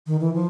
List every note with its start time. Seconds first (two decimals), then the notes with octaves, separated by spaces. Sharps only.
0.07 D#3
0.20 E3
0.34 F3